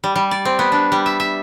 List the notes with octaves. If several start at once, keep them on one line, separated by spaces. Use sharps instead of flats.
G3
G3
D5
C4
B3
D4
G3
E5
E5